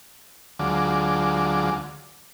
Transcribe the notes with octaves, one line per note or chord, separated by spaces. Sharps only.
D2 D3 F#3 G#3 F4 D6